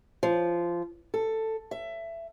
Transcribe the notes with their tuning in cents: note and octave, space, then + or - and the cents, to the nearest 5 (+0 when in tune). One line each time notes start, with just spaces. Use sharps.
F3 -15
A4 +10
E5 +20